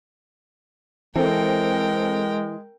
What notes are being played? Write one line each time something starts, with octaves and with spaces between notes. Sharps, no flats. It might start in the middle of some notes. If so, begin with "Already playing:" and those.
E3 G#3 C4 A4 A#4 G5